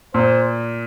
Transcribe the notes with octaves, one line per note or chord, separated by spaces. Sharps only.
A#2 C5